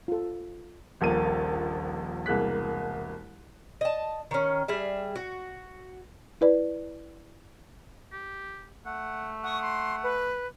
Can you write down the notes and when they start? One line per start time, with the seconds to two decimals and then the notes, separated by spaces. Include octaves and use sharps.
0.08 F4 A4
1.01 D#1 A#1 A#3 D#7
2.26 E1 C2 A#3 G#4 F#6 B6
3.81 D#5 A5
4.31 D#3 C#4
4.68 G3 G#4 E5
5.16 F#4
6.41 E4 B4 D5
8.12 G4
8.86 A3 F#5
9.44 F#5 C#6 D#6
9.61 C6
10.03 B4